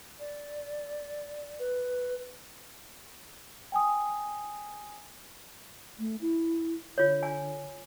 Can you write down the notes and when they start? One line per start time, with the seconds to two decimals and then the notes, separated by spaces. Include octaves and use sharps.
0.20 D5
1.59 B4
3.72 G5 G#5 D#6
5.99 A3
6.21 E4
6.98 D3 F4 C#5
7.23 G#5